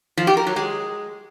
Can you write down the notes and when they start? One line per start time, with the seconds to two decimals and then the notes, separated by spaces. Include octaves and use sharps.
0.17 F3
0.27 G4
0.37 A#4
0.47 F#3
0.56 G#3